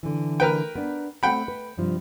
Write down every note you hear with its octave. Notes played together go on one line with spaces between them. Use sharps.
D3 E3
A#4 B4 G5
B3 D4
A3 C4 F#5 G5 B5
B4
G2 C3 F3